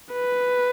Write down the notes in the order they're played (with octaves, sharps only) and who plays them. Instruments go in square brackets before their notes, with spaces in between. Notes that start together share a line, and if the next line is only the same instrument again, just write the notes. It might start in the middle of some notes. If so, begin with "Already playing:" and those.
[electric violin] B4